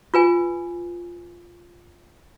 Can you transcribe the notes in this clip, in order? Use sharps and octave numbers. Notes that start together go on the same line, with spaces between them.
F4 B4 G#5